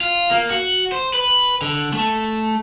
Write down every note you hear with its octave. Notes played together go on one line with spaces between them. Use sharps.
F4
A#3
F#4
C5
B4
D3
A3